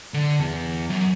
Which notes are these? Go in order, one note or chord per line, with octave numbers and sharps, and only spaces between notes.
D3
E2
F#2